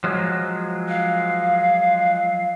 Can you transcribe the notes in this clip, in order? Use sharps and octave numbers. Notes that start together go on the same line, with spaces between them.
F3 F#3 G#3
F5